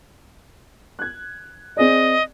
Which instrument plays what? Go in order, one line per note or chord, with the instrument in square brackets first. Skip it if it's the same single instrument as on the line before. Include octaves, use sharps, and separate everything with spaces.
[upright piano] F#6 G#6
[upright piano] C4 G#4 D5 [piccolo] D#5